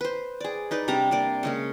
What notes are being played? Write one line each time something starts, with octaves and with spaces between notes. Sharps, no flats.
B4 C5
G#4 D5
D#4 B4 D5
C3 G3 D4 A#5
C3 A#3 D5
C#3 G#3 A#3